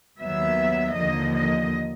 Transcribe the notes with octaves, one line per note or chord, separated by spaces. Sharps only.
D#2 D#3 F#3 B3 E5
D#2 D3 F3 A#3 D#5
D#5